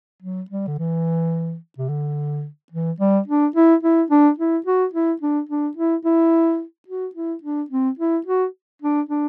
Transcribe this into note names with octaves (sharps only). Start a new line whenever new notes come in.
F#3
G3
D3
E3
C3
D3
E3
G3
D4
E4
E4
D4
E4
F#4
E4
D4
D4
E4
E4
F#4
E4
D4
C4
E4
F#4
D4
D4